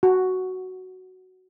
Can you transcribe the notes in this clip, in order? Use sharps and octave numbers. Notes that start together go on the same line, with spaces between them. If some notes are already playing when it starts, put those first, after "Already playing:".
F#4